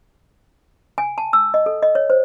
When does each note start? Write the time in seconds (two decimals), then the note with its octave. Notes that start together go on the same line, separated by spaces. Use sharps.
0.98 G#5
1.18 A5
1.33 E6
1.54 D#5
1.66 A4
1.83 D#5
1.95 C#5
2.10 C5